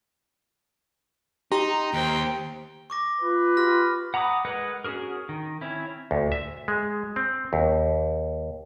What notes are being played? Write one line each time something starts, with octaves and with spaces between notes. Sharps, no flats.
D#4 G4 A#5 C6
D#2 C5 G5
C#6 D6 A#6
F4 B4
F4 G4 F6 A#6
F#5 A#5 B5 D6 D#6
G#3 A#4 B4 D#5 F#5
C#4 D#4 F#4 G#4 A#4
D#3
C4 C#4 E4
D2
E5
G#3
C4
D#2